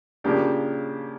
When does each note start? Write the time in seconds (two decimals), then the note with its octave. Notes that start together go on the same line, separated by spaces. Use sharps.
0.24 C#3 F3 A#3 D4 G4